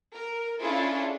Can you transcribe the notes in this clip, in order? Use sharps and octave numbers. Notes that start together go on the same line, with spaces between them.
A#4
C#4 D4 E4 F4 G#4 A4